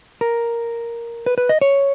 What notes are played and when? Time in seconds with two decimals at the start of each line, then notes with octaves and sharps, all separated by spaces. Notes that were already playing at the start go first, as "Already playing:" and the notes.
0.21 A#4
1.26 B4
1.38 B4
1.49 D#5
1.61 C#5